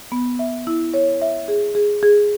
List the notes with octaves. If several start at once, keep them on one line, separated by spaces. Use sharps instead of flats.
B3
E5
E4
C#5
E5
G#4
G#4
G#4